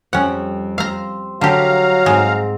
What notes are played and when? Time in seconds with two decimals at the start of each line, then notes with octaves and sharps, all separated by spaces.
0.13 F2 G3 C#4 F#5
0.78 F5 A#5 C6 E6
1.41 D3 F#3 G4 F5 A#5
2.06 G#2 G#3 C4